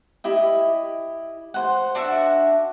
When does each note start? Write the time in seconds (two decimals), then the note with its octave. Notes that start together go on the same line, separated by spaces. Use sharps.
0.24 E4 G4 D#5
1.54 C5 F#5
1.95 D4 F#4 E5